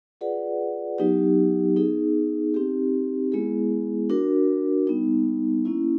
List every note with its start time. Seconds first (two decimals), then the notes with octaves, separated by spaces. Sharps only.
0.21 F4 G#4 B4 D5 F#5
0.98 F#3 B3 D#4 G4
1.76 B3 D#4 G#4
2.54 C4 D#4 G4
3.32 G#3 B3 E4 G#4
4.10 D4 F#4 A#4
4.87 G3 B3 D#4
5.65 A#3 C#4 E4